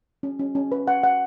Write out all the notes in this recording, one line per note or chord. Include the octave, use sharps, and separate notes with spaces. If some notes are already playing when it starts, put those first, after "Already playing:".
C#4
C#4
C#4
B4
F#5
F#5